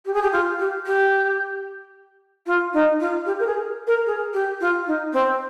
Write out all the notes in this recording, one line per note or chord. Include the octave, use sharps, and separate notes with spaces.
G4
G#4
G4
F4
G4
G4
F4
D#4
F4
G4
A#4
G#4
A#4
G#4
G4
F4
D#4
C4